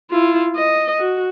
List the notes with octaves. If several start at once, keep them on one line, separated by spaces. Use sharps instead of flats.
E4 F4
D#5
F#4